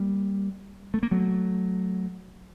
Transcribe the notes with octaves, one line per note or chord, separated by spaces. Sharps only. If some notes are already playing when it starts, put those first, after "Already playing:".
Already playing: G3 A#3
A3
A#3
F#3 A3